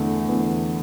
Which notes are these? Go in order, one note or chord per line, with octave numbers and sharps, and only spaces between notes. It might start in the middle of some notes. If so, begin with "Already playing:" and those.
Already playing: E2 D3 A3
E2